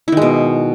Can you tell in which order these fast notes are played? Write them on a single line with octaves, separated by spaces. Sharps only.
E4 D#3 G#3 B2